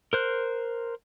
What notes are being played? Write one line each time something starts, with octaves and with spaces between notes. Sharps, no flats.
A#4 C5 F#6